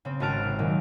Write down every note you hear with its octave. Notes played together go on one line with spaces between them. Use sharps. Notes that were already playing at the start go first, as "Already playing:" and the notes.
C#3 C4
G#1 C#4 F#4 A5 F6 D7
C3
A#2 D#3 F#3